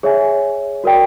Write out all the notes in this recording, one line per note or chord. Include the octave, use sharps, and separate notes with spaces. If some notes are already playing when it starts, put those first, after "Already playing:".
G#4 C#5 E5 G#5
F#4 A#4 D5 G5